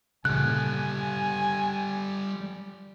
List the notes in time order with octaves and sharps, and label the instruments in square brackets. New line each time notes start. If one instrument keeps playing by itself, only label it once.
[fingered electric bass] A#2 C#3 [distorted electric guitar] G3 A4 [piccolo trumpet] G#5 [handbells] F#6